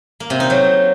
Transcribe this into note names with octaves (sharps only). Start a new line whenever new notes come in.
A#3
C3
D#4
F#3